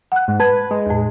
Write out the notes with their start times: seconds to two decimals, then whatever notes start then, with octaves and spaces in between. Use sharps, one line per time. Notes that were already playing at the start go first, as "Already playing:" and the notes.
0.12 F#5 F#6
0.28 G#2
0.40 B4 A5 G#6
0.71 G#3
0.86 E2 A2